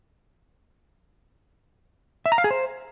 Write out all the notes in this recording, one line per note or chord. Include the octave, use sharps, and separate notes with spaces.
E5
A#5
F5
G#4
C5